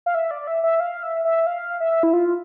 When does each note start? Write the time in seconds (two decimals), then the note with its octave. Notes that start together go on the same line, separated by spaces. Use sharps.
0.06 F5
0.15 E5
0.31 D5
0.47 E5
0.63 E5
0.80 F5
1.03 E5
1.25 E5
1.47 F5
1.80 E5
2.03 E4
2.13 F4